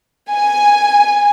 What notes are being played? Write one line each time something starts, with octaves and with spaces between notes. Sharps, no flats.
G#5